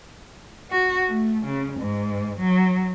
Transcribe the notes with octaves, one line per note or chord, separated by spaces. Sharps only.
F#4
A3
C#3
G#2
F#3